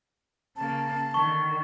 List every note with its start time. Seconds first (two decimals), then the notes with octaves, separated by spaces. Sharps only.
0.56 C#3 A#3 A5
1.14 D3 D#3 C#6